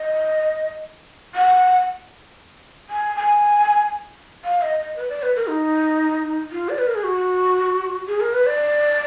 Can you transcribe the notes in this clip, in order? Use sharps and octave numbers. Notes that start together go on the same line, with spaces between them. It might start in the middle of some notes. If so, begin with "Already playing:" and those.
Already playing: D#5
F#5
G#5
G#5
F5
D#5
D#5
B4
D5
B4
A#4
D#4
F4
D5
B4
A#4
G#4
F#4
G#4
A#4
B4
D5